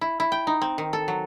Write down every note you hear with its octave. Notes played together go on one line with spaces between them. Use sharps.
E4
E4
G5
D#4
C4
D#3
A4
F#3